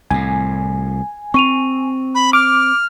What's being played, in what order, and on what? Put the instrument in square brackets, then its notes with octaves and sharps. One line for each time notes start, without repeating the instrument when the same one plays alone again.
[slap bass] C2 A2 [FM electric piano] G#5
[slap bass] C4 [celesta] C#6 D#7 F7
[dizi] B5
[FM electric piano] D6 [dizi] F6